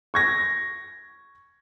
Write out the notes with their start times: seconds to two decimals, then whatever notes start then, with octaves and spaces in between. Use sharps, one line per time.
0.14 C#6 G#6 A#6